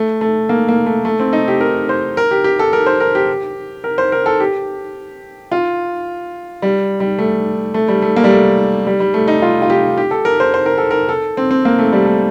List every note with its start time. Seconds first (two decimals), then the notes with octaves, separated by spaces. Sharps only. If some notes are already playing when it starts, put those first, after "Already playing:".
Already playing: A3
0.21 A3
0.49 A#3
0.69 A#3
0.86 A3
1.05 A3
1.20 C4
1.33 D#4
1.48 G4
1.61 A#4
1.89 C5
2.17 A#4
2.31 G4
2.44 G4
2.59 A4
2.73 A#4
2.86 C5
3.00 A#4
3.15 G4
3.84 A#4
3.98 C5
4.12 A#4
4.26 A4
4.40 G4
5.52 F4
6.62 G3
7.00 G3
7.18 A3
7.74 A3
7.88 G3
8.02 A3
8.16 A#3
8.24 G3
8.30 A3
8.87 G3
9.00 G3
9.14 A3
9.28 D#4
9.42 F4
9.62 F4
9.70 G4
9.98 G4
10.11 A4
10.25 A#4
10.40 C5
10.54 C5
10.66 A#4
10.78 A4
10.91 A#4
11.09 A4
11.37 C4
11.51 C4
11.65 A#3
11.79 A3
11.93 G3
12.06 A3